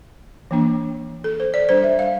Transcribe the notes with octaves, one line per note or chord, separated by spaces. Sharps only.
E3 A#3 D4
A4
C5
D5
G3 D4 C5
E5
F5